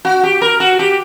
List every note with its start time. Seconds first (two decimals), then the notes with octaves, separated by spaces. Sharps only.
0.05 F#4
0.23 G4
0.42 A#4
0.60 F#4
0.79 G4